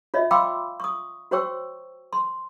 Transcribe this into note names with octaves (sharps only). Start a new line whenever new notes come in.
F4 C#5 D#5 E5
F5 G5 B5 C6 D6 E6
C#6 D#6
F#4 C5 C#5 G5 C#6 E6
C6